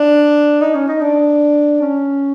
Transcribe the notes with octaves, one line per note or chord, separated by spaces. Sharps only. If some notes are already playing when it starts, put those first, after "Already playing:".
Already playing: D4
D#4
C#4
D#4
D4
C#4